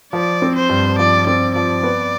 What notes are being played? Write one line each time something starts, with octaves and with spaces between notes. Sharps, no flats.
F3 D5
C4
C5
G2
F3 D5
C4 D5
F3 D5
B3